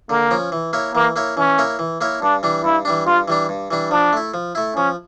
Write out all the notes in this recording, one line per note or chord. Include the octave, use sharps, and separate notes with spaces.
D3 A#3
F3 C#4
E3
A#3 E4 A#4 C#5
E3 A#3
A#3 E4 A#4 C#5
E3 C#4
A#3 E4 A#4 C#5
E3
A#3 E4 A#4 C#5
G2 D4
E3 G3 D4
G2 E4
E3 G3 D4
G2 F4
E3 G3 D4
G2
E3 G3 D4
F3 D4
A3 E4
F3
A3 E4
F3 C#4